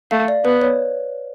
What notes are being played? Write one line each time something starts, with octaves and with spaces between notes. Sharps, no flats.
A3 F5
D5
B3 B4
C#5